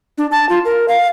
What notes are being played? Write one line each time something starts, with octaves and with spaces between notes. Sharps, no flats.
D4
A5
F4
A#4
F5